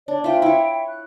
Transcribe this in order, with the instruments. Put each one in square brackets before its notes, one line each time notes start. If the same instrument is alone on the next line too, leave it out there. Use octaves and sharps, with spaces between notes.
[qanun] D4 [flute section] C#5 D5
[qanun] F4 C5 [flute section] E5 G5
[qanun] E4 C#5
[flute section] F#6